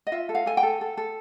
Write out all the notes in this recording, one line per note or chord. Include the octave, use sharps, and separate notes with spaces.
D#5
F4 E5
A4
F5
A4 G#5
G5
A4
A4
A4